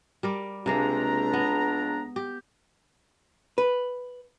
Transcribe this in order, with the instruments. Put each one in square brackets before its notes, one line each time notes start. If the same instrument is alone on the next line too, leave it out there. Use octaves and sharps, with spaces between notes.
[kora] G3 A#4 D5
[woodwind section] C#2 D4 A#5 [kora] C3 G#3 A#3
[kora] B3
G4
[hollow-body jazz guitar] B4